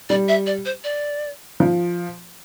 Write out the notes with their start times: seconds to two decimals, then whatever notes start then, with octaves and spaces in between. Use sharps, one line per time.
0.10 G3 D5
0.28 E5
0.47 D5
0.65 C5
0.84 D5
1.60 F3